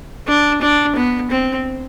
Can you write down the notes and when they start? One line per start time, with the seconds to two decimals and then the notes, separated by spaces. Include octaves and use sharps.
0.28 D4
0.62 D4
0.96 B3
1.31 C4